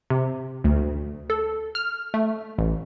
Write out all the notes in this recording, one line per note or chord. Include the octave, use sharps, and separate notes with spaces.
C3
D2
A4
F6
A3
A1